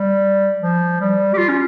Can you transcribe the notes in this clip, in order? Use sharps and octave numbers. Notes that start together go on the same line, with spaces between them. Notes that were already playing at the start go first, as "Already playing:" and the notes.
Already playing: G3
F3
G3
G4
F4
C#4